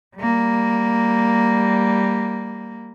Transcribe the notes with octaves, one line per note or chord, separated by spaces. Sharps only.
G3 A#3